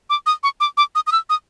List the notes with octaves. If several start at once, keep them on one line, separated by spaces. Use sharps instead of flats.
D6
D#6
C#6
D6
D6
D#6
D#6
E6
D#6